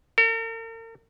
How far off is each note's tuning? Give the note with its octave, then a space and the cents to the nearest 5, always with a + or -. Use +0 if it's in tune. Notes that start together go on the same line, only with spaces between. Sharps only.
A#4 -45